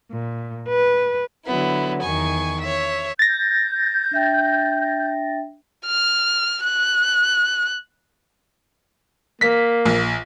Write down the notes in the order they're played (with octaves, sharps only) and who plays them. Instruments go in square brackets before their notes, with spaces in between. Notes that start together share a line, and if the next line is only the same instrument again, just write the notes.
[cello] A#2
B4
[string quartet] D3 F#3 B3 E4
E2 D#3 G#5 C#6
C#5 E5
[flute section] G6 [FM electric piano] A6 A#6
[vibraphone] D4 E5 G5
[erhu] F6
F#6
[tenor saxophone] A#3 [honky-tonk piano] B6
[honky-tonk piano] A#1